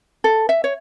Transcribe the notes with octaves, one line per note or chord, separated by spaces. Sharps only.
A4
E5
C#5